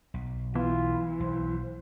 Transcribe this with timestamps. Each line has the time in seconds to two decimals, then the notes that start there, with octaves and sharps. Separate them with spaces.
0.14 B1
0.55 E3 B3 F4
1.20 B1 C5